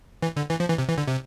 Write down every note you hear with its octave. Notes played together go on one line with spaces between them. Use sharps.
E3
D3
E3
F3
E3
C3
E3
D3
C3